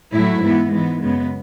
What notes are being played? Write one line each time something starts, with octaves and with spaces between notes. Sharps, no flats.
A2 F#3 A3 E4
G#2 E3 B3
G#2 E3 G#3 B3
F#2 C#3 G#3 B3